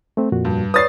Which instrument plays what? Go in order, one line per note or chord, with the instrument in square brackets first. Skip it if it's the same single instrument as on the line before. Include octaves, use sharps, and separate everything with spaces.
[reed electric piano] A3 C4
F2 A#2 F#4
[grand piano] G2
[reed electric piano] B4 C#5 D5 [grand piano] D#6 A6 C7